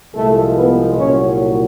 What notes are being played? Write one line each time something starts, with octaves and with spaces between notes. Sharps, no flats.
C2 A#2 F3 G#3 A3 A4
B3 B4
C2 A#2 F#3 C#4 C#5